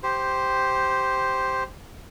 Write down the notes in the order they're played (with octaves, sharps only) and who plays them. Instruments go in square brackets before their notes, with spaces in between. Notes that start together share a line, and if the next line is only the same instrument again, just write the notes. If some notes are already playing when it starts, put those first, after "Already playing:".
[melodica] G4 C5